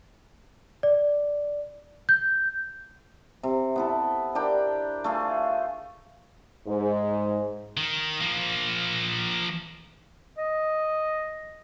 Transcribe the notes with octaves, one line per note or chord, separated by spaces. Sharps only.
D5
G6
C3
B3 E4 A4
D4 G4 A#4 G5
A3 F4 G#4 F5
G#2
D#3
F3 A#3
D#5